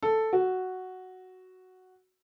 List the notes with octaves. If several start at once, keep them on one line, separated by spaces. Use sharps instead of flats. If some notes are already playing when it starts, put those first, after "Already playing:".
A4
F#4